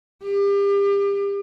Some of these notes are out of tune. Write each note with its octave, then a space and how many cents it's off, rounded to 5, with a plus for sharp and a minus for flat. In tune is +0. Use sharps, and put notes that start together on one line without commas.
G4 +35